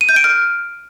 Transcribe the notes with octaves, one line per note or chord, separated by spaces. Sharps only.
D#7
G6
D7
F6